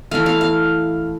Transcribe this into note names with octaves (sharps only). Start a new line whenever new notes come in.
E3 A3 F5
F5
F5